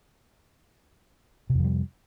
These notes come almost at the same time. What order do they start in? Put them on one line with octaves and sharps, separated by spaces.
C3 F2 F3 G3